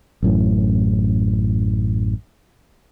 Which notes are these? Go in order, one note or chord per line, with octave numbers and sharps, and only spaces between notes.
A1 F#2 A2